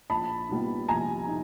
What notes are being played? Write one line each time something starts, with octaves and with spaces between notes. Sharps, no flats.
A#1 A5 B5
A#2 G3 B3 D#4
A#1 G#5 A#5
D#4